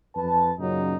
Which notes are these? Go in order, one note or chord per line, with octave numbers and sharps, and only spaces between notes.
F2 B4 A5
F#2 A#2 C#3 F#3 D#4